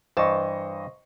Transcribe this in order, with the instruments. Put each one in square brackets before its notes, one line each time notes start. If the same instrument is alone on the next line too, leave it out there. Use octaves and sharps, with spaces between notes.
[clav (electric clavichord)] G2 E3 A5 [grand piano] C5 D#5 C#6